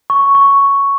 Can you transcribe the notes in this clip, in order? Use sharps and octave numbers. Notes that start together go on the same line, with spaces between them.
C#6
C#6